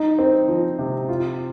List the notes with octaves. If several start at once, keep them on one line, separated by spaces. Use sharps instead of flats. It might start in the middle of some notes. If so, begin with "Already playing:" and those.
Already playing: D#4
C4
F3
C3
F4